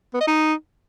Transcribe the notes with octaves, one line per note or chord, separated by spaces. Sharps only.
B3
D#5
D#4